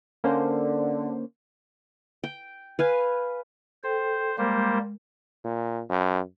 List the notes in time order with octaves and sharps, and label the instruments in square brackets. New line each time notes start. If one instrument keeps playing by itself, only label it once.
[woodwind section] D3 [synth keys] A#3 C#4 C5
[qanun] G5
B4 F5 G#5
[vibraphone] A4 G5 [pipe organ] C5
[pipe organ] G3 A#3 C5 [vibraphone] G#3 A#4
[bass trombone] A#2
F#2